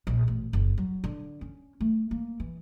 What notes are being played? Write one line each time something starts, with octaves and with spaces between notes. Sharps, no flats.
A#1
A1
F#1
F#3
D3
C#4
A3
A#3
E3